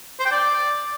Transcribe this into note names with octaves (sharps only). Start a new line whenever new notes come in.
C5
G5
D5